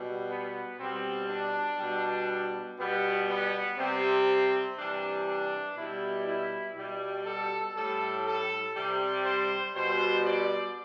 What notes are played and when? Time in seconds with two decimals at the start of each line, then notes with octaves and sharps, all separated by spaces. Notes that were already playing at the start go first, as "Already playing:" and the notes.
Already playing: B2 G3
0.29 B3
0.79 B2 G3 C4
1.29 D4
1.79 B2 G3
2.78 B2 G3 B3
3.28 B3
3.78 C3 G3 C4
4.77 C3 E3 G3 D4
5.28 D4
5.77 B2 G3 E4
6.27 E4
6.77 B2 G3
7.26 A4
7.76 A2 G3 A4
8.25 A4
8.75 C3 G3
9.25 C5
9.75 B2 G3 C5
10.26 D5